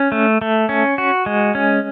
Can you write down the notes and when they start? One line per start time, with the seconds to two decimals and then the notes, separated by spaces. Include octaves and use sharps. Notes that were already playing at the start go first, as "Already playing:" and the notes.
Already playing: C#4
0.12 A3
0.41 A3
0.69 C#4
0.98 F#4
1.26 G#3
1.55 C#4